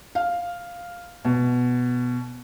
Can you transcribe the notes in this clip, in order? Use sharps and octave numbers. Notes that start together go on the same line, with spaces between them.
F5
B2